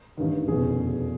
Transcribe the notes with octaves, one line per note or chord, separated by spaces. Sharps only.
A1 G2 D#3
F1 E2 B2 G#4